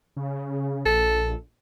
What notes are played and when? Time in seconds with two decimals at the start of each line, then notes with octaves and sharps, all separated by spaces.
0.16 C#3
0.86 A#1 A4